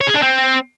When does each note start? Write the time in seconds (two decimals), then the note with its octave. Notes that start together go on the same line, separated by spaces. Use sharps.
0.01 C#5
0.08 G#4
0.16 D4
0.23 C4